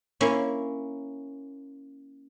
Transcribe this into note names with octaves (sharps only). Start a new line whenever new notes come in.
A#3 C#4 E4